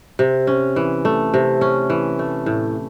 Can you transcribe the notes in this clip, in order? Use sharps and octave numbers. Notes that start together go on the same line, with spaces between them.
C3
C#4
E3
A3
C3
C#4
E3
A3
A2